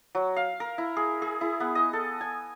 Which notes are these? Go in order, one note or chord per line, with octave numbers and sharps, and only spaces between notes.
F#3
F5
A#4
E4
G#4
G#4
E4
B3
D#5
A4
G#5